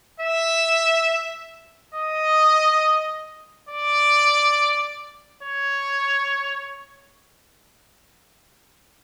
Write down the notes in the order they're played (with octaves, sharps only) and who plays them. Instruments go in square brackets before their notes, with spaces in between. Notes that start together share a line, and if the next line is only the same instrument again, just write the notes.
[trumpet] E5
D#5
D5
C#5